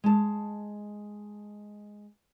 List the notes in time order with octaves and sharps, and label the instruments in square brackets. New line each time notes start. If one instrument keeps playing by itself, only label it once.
[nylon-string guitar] G#3 A5